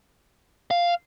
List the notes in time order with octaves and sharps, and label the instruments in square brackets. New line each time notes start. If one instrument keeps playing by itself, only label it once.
[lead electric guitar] F5